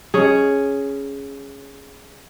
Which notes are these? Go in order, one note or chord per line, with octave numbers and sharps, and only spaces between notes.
C#4 G#4